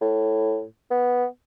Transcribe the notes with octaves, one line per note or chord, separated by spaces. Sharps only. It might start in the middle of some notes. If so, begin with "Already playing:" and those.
A2
B3